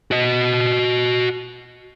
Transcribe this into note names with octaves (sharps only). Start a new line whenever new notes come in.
F#4 D#5